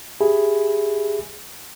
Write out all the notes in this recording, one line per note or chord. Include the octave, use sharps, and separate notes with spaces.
G4 G#4 E5 G#5 B5